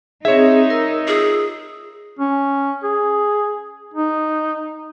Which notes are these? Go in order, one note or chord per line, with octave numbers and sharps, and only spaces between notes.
C4 D#4 G#4 C#5 E5
A#4 E6
F4 G#4 E6
C#4
G#4
D#4